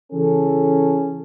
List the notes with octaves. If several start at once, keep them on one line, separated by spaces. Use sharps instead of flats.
C#3 E3 C#4 G#4 A4